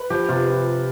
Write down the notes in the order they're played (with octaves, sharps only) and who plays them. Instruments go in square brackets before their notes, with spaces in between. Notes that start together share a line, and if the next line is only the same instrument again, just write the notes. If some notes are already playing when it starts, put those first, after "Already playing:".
Already playing: [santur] B4
[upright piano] F3 [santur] G4
[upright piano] C3 [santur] F4